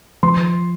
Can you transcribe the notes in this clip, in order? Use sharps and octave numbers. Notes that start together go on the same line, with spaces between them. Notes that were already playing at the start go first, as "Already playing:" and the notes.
F3 C6